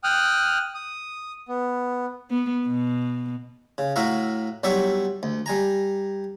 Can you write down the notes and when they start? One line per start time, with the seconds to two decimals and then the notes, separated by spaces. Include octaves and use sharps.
0.04 G5 D#6 F6 F#6
0.74 D#6
1.48 B3
2.30 B3
2.66 B2
3.78 C#3
3.96 A2 F#4 E5 F5 A#5
4.64 B1 F#3 G3 D5 E5 C#6
5.23 D2
5.46 G3 G#5 A#5